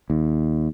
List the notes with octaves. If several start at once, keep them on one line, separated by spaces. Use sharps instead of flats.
D#2